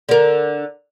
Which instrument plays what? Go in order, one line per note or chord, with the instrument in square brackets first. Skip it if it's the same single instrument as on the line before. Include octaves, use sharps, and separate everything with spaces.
[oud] D3 A#4